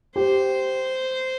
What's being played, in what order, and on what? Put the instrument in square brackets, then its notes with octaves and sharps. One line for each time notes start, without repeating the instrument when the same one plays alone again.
[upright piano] G4 [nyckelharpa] C5